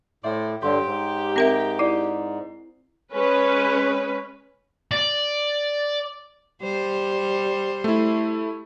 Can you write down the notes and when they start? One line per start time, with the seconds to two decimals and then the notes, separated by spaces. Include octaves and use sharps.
0.24 A2 C5 D5 E5
0.63 G2 D3 G4 C#5 C6
0.86 G#2
1.36 C4 A#4 E5 A#5 A#6
1.79 E4 D5 C7
3.12 G#3 C#4 B4
4.91 D5
6.62 G3 C5
7.84 A3 E4